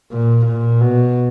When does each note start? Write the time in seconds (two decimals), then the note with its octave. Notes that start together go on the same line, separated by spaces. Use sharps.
0.11 A#2
0.46 A#2
0.81 B2